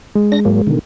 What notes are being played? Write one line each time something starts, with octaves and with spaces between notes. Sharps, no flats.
G#3
D4 A#6
G#2 F#3 A#3
B2 D3 D#3